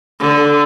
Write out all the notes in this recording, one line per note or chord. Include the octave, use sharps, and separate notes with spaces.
D3